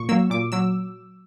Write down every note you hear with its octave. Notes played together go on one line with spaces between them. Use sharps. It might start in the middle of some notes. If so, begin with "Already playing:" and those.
Already playing: A#2 C#6
F#3 A#3 E6
A#2 D6
F#3 E6